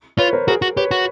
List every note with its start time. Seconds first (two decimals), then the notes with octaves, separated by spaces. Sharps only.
0.18 F4 B4 C#5
0.33 A#4 C5
0.48 F#4 G#4 A#4
0.62 F#4
0.77 G4 B4 C#5
0.91 F#4